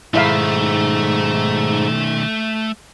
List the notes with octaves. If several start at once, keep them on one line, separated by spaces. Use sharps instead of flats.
B1 G#2 D#3 A3 E4 E5 F5